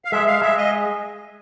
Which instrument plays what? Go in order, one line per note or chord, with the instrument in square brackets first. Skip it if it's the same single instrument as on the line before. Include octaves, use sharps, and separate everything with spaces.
[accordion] F5
[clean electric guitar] G#3 [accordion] E5
[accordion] F5
[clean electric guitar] G#3 [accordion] E5
[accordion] D#5